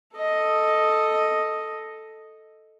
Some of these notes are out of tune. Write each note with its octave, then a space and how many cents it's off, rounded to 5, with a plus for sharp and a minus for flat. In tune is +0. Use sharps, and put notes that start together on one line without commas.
A4 +0 D#5 +0